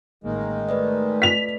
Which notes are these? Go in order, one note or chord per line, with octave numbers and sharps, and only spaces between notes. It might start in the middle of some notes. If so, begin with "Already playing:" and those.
A1 D#3 G#3 A#3
A3 B4 D5 D#5
B6 F7